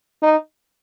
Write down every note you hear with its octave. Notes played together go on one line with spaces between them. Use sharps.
D#4